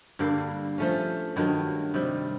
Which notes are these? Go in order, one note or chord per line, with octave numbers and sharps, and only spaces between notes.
G2 D3 G3 A#3
F3 A3 C#4
G2 D#3 F#3
C3 D#3 G3